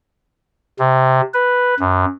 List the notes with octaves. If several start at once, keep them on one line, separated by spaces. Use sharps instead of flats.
C3
B4
F#2